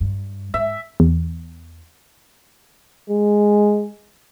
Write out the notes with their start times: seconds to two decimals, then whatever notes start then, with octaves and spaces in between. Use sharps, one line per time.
0.01 G2
0.54 G#2 E5
1.00 E2
3.10 G#3